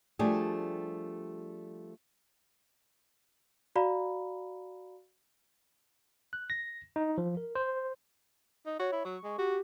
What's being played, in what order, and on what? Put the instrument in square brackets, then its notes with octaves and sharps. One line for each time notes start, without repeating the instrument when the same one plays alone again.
[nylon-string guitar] F3 G3 A3 D4 G4 G#4
[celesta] F#4 D5 F5 A#5 B5
[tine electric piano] F#6
A#6
D#4
F3
A#4
C5
[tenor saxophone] D#4
[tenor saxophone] F#4 [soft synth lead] C#5
[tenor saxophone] E4
[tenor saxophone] F#3 [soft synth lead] C#6
[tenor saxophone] G#3
[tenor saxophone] F#4 [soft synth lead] G4